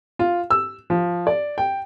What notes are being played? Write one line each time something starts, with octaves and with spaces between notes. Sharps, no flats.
F4
E6
F3
D5
G5